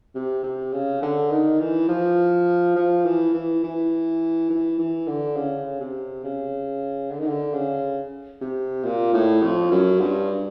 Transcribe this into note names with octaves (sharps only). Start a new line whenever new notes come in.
C3
C3
C#3
D3
D#3
E3
F3
F3
E3
E3
E3
E3
E3
D3
C#3
C3
C#3
D3
D#3
D3
C#3
C3
A#2
A2
F2
F#2
G2